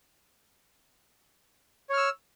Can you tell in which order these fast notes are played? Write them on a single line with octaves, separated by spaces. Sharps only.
C#5 F6 E6